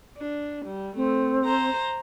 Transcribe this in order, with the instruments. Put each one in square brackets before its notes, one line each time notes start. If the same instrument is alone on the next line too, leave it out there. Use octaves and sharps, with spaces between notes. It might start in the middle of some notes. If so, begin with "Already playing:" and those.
[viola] D4
G3
[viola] A3 [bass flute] C4
[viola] C5 A#5